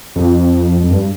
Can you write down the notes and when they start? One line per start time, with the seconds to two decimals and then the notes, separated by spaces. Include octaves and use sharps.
0.16 F2
0.81 F2
0.91 G2